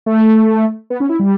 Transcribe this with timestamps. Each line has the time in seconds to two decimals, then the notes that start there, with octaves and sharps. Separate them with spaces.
0.06 A3
0.90 B3
1.00 C#4
1.09 E4
1.19 G3